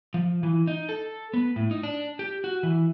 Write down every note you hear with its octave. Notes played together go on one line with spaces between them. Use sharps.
F3
E3
D#4
A4
B3
A2
D#4
D4
G4
F#4
E3